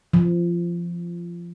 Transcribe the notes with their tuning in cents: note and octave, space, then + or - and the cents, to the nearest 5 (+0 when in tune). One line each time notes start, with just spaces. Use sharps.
F3 -20